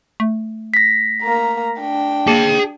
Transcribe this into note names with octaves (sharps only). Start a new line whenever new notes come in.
A3
A#6 B6
A#3 A#5
D4 G5
A#3 G#4 A5